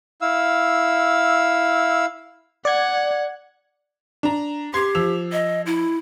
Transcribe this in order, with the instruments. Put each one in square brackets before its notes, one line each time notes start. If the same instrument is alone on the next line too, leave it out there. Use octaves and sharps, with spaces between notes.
[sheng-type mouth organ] E4 F5 E6
[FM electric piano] D5 G#6 [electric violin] F#5
[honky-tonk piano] D4 A#5
[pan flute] G4 [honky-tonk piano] C6 G#6 C7
[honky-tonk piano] F3 E6 F7
[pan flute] D#5
E4